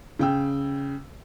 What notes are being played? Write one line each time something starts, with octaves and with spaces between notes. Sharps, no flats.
C#3 G5 E6